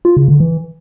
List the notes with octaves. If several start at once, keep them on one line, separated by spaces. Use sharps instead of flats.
F4
C#3
D3
E3